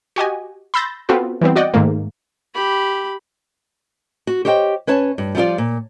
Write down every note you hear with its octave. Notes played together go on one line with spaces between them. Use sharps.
F#4 G4 D#5 G#5
B5 C6 E6 G6 A6 A#6
B3 C4 F4 F#4 A4 B4
E3 G3 B3 C4
F#4 D5 D#5 F#5 G5
G#2 D#3 A3 A#3
G4 B5
F#4
G4 C5 C#5 D#5 E5 G5
C#4 B4 C#5 A5
G2
F3 G3 E4 F4 D5
A#2